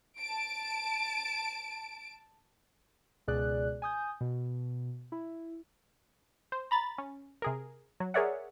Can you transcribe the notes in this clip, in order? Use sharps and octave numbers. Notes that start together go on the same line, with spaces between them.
A5 D7
C#2 B2 G#4 D5 F#6
G#5 D#6 G6
B2
E4
C5
A#5 B5 A6
C#4
C3 G#4 A#4
F#3
G#4 A#4 C#5 D5 E5 F#5